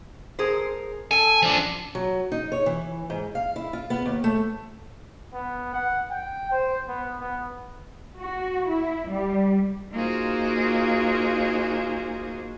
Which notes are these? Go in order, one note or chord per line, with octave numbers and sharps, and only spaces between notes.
G#4 A#4 C5
A4 G#5 A5
F3 D4
F#3
D#4
C#5
E3
G#2
F5
E4
F4
B3
D#2
A3
B3
F#5
G5
C5
B3
B3
F#4
E4
G3
A#3 D#4 F4 F#4 G#4 C5